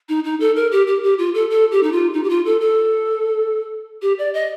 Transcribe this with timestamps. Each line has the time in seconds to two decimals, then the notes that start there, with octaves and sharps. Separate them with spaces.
0.09 D#4
0.24 D#4
0.40 A4
0.56 A#4
0.72 G4
0.87 G4
1.03 G4
1.18 F4
1.34 A4
1.50 A4
1.71 G4
1.83 D#4
1.92 F4
2.14 D#4
2.24 G4
2.30 F4
2.46 A4
2.61 A4
4.02 G4
4.19 D5
4.34 D#5